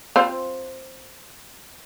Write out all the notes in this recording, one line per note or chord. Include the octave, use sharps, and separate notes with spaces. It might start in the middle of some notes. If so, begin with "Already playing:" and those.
C4 F4 C5